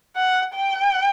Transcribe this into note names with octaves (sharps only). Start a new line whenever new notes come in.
F#5
G5